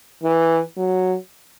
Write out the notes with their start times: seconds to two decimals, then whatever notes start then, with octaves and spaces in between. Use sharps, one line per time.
0.24 E3
0.77 F#3